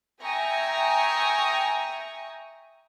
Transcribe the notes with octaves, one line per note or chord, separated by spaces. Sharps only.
E5 G5 G#5 A#5 C#6 D#6